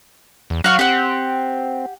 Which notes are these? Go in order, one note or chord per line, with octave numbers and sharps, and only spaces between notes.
E2
F#3 F#4 F5 C#6
C4 G4 F#5